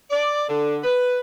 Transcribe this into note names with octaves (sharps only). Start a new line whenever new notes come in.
D5
D3
B4